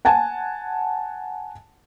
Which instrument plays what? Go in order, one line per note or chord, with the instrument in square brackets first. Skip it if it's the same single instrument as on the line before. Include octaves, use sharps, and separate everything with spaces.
[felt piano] F#5 G#5 A5